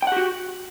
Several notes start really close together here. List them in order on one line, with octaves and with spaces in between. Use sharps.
G5 F#5 G4 F#4